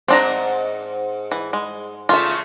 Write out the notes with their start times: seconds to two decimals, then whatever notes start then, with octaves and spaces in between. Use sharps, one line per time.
0.08 G#2 C4 D4 C5 A#5
1.32 E3
1.53 G#3
2.09 C#3 A3 F4 E5